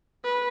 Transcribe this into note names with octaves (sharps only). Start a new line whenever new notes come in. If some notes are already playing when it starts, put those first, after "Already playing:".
B4